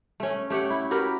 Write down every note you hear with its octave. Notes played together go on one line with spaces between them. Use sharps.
A3 C#4
A3 G4 C#5 F#5
E4
F#4 G4 A#4 B4